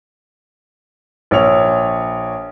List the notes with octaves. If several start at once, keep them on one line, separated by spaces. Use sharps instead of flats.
A#1 C#5 F7